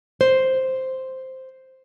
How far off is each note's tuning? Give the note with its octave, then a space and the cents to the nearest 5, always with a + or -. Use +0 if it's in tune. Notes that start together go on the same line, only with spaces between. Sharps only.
C5 +0